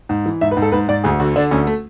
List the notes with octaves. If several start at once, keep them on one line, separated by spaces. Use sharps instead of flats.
G#2
E3
G#2 E5
B4
G#2
A4
G#2 B4
G#2 D5
D2 G#4
D3 F#4
D3 D4
D2 C#4
A3